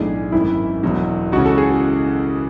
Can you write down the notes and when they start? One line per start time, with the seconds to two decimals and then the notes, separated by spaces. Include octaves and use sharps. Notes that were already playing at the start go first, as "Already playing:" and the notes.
Already playing: B1 A2 E3 A3 D4 G#4
0.32 G#1 F#2 E3 E4
0.83 E1 E2 B2 F#3
1.32 C#2 C#3 E3 F#4
1.46 A4
1.58 G#4
1.70 F#4